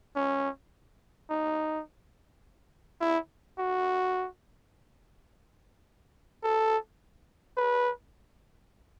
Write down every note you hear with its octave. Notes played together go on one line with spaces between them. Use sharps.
C#4
D#4
E4
F#4
A4
B4